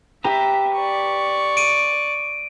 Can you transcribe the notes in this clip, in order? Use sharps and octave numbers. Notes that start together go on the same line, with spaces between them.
G4 B4 E5 A#5
D5 C#6
D7 D#7